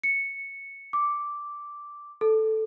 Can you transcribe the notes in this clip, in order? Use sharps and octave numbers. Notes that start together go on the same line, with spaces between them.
C#7
D6
A4